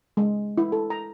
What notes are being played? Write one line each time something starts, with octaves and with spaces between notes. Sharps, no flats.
G#3
E4
A4
A#5